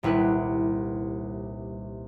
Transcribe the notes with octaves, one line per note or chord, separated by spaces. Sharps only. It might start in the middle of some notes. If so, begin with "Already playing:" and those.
D#1 C2 E4 B4 F#6